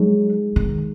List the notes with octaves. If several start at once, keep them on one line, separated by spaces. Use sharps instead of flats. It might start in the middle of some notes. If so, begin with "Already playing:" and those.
Already playing: F#3 G#3 D#4
D#3